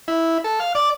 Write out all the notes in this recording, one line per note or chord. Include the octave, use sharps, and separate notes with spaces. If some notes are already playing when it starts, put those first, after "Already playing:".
E4
A4
F5
D5